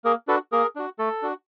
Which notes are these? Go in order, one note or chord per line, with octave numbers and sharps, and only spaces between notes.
A#3 G#4 A#4
D4 F#4 A4 B4
A#3 G#4 A#4
D4 F#4
A3 A4
D4 F#4